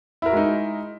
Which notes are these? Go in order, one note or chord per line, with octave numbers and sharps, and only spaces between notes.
G#3 D#4 E4 F#4 A#4